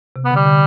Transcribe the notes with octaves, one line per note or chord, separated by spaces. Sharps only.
C3
B3
D3 G3
D3